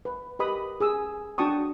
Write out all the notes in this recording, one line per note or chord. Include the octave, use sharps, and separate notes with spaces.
B4
G4 A#4 B4 D#5 B5 D#6
G#4 D#6 E6
D4 F#4 G5 A5 C#6 D#6